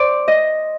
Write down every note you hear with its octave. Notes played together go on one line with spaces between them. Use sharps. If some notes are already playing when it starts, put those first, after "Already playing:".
Already playing: C5 D5
D#5